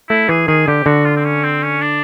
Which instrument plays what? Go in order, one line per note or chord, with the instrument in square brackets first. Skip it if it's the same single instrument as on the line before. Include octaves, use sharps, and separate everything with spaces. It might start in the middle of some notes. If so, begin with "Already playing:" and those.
[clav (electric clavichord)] A3 [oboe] E4
[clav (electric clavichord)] E3 [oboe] G#4
[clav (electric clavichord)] D#3 [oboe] G#4
[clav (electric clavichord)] D3 [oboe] G4
[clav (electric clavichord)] D3 [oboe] F#4
[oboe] F4
C4
C#4
C4
C#4
D4